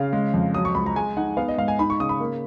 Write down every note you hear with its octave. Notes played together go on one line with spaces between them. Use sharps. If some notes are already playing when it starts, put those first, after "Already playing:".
Already playing: C#3 F5
G#3
F2
F#3 D#6
C#6
C#2 B5
A#5
G#3 G#5
D#4 F#5
B3 F5
D#5
G#2 F5
G#5
D#4 B5
C#6
C#3 D#6
B5
A#3